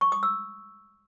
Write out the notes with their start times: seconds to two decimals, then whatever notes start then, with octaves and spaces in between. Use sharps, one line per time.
0.01 C#6
0.12 D#6
0.23 E6